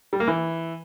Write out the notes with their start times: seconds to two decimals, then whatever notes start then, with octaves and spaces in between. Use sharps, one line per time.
0.13 G3
0.20 A#3
0.28 E3